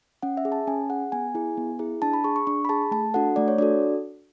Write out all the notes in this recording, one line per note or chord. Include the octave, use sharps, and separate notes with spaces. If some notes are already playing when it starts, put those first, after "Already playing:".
C#4 F#5
E5
G#4
A5
C#4 G#5
G#4 F#5
B3 G#5
E4 G#4
B3
E4 G#4
D4 A5
B5
G#4 C#6
C#6
D4 C#6
B5
G#4 A5
A3 A5
D4 F#4 A4 F#5
A3 D5
C#5
D4 F#4 A4 D5